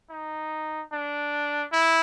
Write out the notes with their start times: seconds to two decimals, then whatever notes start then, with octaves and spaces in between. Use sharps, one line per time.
0.10 D#4
0.92 D4
1.73 E4